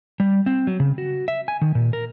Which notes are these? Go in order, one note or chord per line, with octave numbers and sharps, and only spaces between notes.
G3
C4
F#3
C#3
F#4
E5
G#5
D#3
A#2
A#4